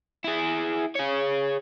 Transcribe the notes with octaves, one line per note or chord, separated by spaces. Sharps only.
E4 G#4
G#4 C#5